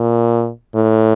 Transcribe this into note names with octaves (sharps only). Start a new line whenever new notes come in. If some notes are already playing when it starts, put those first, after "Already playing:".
Already playing: A#2
A2